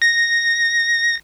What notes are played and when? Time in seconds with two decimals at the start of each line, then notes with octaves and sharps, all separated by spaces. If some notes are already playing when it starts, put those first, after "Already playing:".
0.02 A#6